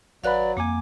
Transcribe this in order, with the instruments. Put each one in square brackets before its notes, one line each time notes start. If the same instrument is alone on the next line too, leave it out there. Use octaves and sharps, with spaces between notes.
[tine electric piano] G#1 B4 B5 [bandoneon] F#3 [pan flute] D5 [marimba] F5 F#5 F#6
[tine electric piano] F2 G#5 [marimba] A#3 [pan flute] D6